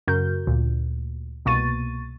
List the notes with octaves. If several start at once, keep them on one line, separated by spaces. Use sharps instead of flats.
F#2 C#3 F#4 A#4 G6
D2 A#2
C2 B2 A#3 C#6 A6 D#7